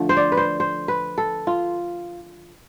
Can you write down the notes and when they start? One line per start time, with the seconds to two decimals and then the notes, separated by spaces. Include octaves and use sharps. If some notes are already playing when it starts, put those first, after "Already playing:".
Already playing: D3 F3 A3
0.09 C5
0.17 D5
0.32 B4
0.37 C5
0.60 C5
0.88 B4
1.18 A4
1.47 F4